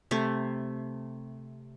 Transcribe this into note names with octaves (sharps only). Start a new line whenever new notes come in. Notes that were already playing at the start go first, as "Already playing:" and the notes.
C3 A3